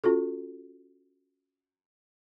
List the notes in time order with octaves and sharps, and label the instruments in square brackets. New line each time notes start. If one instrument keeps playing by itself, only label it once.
[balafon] C#4 F4 F#4 A4